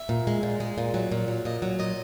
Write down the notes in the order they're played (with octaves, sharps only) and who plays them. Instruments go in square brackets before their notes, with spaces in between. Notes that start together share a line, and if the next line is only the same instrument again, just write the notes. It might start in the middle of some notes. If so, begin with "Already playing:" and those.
Already playing: [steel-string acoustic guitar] E5
A#2
G#3
A#2
G#3
A#2
F#3
A#2
F#3
A#2 D#5
F#3
A#2 D#5